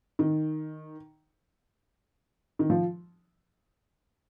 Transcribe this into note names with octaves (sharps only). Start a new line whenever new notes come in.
D#3
D#3
F3